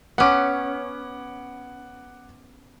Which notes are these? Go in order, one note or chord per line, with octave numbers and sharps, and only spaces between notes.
B3 C#4 F#5 D6